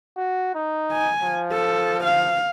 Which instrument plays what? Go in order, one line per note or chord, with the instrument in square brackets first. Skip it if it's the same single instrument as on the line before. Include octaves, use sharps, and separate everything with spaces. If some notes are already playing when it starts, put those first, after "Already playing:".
[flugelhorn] F#4
D#4
[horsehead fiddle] G#5
[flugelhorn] F3
[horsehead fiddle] A4
F5